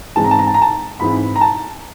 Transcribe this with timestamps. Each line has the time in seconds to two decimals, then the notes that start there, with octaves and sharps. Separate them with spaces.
0.16 G#2 E3 G#3 C4 E4 A5
0.24 A#5
0.31 A5
0.39 A#5
0.47 A5
0.54 A#5
0.62 A5
1.00 G#2 E3 G#3 C4 E4 B5
1.36 A#5
1.41 A5